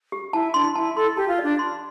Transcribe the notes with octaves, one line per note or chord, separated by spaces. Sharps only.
G4
E4 A5
D4 C6
E4 A5
A4 C6
G4 A5
F4
D4 D5
C6